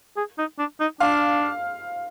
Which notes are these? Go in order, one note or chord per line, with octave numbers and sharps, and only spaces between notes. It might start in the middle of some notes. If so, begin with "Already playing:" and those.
G#4
D#4
D4
D#4
D4 F5